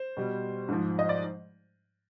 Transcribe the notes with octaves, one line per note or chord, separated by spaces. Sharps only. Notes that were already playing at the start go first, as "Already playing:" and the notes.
Already playing: C5
B2 G3
G#2 F3
D#5
D5